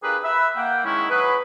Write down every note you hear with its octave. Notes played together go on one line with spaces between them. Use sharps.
D4 F4 G4 G#4 A#4 B4
B4 E5
A#3 F#5 G5
D#3 G#3 C#4 E4
F#3 G#4 B4